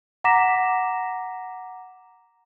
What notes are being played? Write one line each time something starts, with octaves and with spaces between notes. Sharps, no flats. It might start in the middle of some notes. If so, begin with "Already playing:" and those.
F#5 A#5 D6 A#6 B6 E7